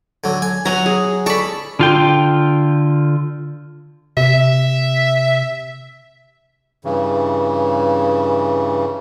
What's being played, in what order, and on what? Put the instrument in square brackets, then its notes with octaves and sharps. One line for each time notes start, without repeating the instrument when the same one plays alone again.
[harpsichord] D3 F#3
G#5
[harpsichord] F#3 [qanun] F#5 G#5 A#5
[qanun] G#4
[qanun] A4 B5 [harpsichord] D5 C#6
[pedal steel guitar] D3 F4 G5
[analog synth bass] C3 [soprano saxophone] E5
[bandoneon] G2 C#3 E3